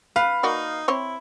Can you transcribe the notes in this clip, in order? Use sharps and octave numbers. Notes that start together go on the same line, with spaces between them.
B4 F5
A#3 D#4 F#4 D5
C4 E4 C5 C#5